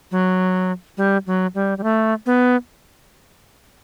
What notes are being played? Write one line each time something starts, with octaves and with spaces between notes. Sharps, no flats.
F#3
G3
F#3
G3
G3
A3
B3